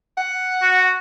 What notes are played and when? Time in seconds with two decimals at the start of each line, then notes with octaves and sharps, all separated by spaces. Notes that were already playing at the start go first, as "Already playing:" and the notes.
0.17 F#5
0.62 F#4